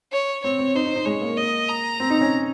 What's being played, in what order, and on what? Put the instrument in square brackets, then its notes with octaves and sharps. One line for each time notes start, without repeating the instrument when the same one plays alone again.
[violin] C#5
[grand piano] C4 [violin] C#5
[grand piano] C4
[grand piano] D#4 [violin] C5
[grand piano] D#4
D#4
[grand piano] G#3 [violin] C#5
[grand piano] A#3
[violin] D#5
A#5
[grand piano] C4
D#4
C#4